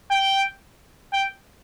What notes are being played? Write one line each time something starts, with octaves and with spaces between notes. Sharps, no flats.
G5
G5